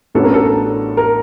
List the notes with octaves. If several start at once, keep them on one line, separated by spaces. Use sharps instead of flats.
A1 A2 F#3 B3 D4 A4
A#4
A4
A#4